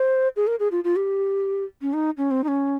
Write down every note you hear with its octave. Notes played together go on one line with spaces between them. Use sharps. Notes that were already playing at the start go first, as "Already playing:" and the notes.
Already playing: C5
G#4
A#4
G#4
F4
F4
G4
C#4
D#4
C#4
C4
D#4
C#4